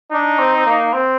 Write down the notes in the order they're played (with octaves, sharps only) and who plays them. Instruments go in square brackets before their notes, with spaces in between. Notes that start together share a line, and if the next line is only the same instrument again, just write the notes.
[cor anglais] D4 [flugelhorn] D#4
[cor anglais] C4
C4
A#3
C4